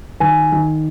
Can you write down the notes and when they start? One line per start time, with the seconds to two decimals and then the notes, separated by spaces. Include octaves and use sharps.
0.20 D#3 G#5
0.52 D#3